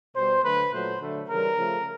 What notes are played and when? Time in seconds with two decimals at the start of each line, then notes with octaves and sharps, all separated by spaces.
0.16 B2 G3 C5
0.44 D3 F#3 A3 B4
0.72 A#2 F#3 A3 C5
1.01 D3 F#3 A3
1.29 C#3 E3 G3 A#4
1.56 C#3 F3 A3